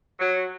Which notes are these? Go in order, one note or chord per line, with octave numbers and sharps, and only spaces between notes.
F#3